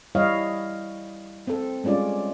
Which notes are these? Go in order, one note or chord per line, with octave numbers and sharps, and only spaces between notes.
G3 E4 C#5 D#5 F5
C4 A4
G3 G#3 C#4 F4 D5